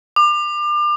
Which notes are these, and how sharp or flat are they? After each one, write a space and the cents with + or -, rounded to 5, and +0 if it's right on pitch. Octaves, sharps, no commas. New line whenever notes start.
D6 +35